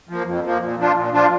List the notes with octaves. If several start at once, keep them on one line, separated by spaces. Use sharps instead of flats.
F3 A#3
F2
F3 A#3
A#2
F3 D4 F4
A#2
F3 D4 F4